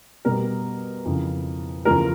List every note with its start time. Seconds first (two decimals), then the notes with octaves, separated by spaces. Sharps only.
0.25 B2 G3 A#4
1.05 F2 C#3 E3
1.85 E2 C#3 F3 A#4